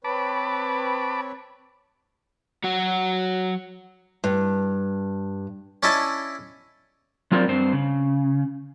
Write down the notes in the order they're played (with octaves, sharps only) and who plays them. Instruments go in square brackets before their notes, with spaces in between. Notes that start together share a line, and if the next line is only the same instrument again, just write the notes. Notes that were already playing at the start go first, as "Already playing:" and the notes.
[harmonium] C4 B4 C#5 [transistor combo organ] A5 B5 D6
[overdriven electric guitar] F#3 F#4
[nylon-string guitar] G2
[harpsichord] C#4 D4 E4 D#5 A5
[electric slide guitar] F#3 C4 F4 A#4 C5 D5
G2 C4 C5
C#3